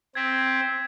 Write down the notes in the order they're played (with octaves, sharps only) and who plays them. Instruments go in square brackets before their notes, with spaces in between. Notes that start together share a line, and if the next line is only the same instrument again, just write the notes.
[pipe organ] C4 [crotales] G#6 B6